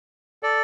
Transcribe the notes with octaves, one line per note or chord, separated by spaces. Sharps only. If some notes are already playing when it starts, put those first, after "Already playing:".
A4 D5